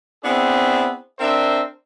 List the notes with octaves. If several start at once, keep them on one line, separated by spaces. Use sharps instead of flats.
B3 C4 D4 E4 G#4
C4 D4 A#4 C5 E5